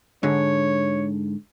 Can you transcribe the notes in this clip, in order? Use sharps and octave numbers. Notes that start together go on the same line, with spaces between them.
G#2 D3 C#5